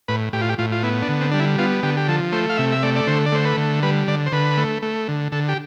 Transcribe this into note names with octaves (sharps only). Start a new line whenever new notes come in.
A2 B4
A2 G4
F4
G4
A2 F4
F4
B3 E4
D4
D3
C4
G3 D4
E4
B3 F4
D3 G4
G4
F3 A4
A3 C5
F5
C3 E5
E5
A3 D5
D5
D3 C5
D5
A3 C5
B4
D3
G3 B4
D3 D5
C5
D3 B4
A3
A3
D3
D3 A4
G4